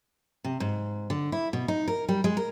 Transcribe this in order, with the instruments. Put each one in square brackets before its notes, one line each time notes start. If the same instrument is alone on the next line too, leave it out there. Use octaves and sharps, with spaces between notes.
[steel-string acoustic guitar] C3
G#2
D3
E4
B2
D#4
A#4
G3
G#3
A#4